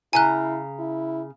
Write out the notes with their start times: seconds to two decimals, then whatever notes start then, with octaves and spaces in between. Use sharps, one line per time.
0.13 C#3 E4 G#5 A#5 F#6
0.79 E4